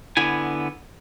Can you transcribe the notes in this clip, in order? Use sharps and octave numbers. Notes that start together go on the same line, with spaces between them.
D3 B3 E4 G#5